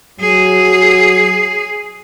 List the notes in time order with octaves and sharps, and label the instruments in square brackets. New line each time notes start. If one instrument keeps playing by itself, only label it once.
[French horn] F#3 [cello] G#4